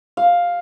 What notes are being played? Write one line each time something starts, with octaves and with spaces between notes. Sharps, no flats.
F5